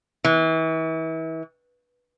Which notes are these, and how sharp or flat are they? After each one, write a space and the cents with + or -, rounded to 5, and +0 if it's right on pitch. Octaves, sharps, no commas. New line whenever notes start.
E3 -35